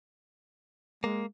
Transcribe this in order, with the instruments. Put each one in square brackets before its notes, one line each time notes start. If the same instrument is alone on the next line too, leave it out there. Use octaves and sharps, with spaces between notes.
[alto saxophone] G#3 [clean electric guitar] A#3